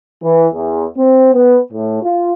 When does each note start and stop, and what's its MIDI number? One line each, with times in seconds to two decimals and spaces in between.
0.22 0.46 52
0.53 0.85 40
0.97 1.30 60
1.34 1.58 59
1.71 2.00 45
2.01 2.31 65